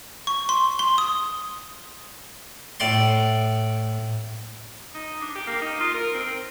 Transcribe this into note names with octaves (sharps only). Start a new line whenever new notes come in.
C#6
C6
C6
D#6
A2 D5 C6
D#4
D4
G4
A#3
D#4
F4
A#4
C4